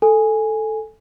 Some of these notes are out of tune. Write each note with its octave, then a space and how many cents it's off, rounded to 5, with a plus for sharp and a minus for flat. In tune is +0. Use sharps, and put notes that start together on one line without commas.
A4 +0 G#5 +0